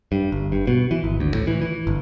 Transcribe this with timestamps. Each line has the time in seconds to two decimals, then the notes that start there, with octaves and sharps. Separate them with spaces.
0.12 G2
0.32 G1
0.52 G2
0.67 B2
0.91 E3
1.04 G#1
1.20 D2
1.34 A2
1.47 E3
1.62 E3
1.87 G1